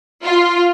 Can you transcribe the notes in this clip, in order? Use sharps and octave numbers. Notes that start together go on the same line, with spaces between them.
F4